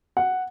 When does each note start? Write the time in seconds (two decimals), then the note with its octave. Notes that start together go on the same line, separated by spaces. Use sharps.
0.17 F#5